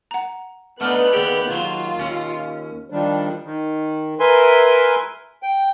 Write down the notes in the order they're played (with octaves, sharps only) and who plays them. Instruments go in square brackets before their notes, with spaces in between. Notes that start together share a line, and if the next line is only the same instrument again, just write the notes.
[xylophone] F#5 A#5
[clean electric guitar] A3 D4 D#4 [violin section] B3 F#6 [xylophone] F#5 F6
[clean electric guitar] D#2 G4 [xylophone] G#4 D5
[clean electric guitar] D#2 F#3 [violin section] F4
[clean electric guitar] D#2 C#4
[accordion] D#3 F3 G3 D4
D#3
A#4 B4 E5 G#5 C6
G5